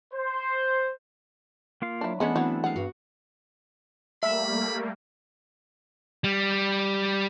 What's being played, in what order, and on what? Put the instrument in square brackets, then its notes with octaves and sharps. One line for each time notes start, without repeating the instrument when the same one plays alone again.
[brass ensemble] C5
[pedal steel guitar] A#3 F4 F5
[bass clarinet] F#3 [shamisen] D4 E4
[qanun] E3 E4 F#5 [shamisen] G#3 C#4 [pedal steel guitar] A3 D4 [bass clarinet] B3
[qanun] E3 F#3 C4 [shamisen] C#5 F#5
[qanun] G#3 B3 F5 [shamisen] F#5
[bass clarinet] G2 [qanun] F#4
[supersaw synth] G3 A3 A#3 [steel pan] E5 [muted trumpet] B5
[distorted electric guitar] G3